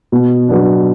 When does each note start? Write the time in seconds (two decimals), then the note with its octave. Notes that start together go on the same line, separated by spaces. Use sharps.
0.12 B2
0.49 F#3 B3 D4